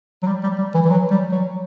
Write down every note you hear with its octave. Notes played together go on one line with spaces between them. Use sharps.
F#3
G3
G3
G3
E3
E3
F#3
G3
F#3